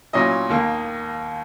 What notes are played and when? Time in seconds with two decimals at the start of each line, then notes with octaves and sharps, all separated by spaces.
0.13 A#2 F#3 C#4 E4 D#5
0.49 D#2 D#3 A#3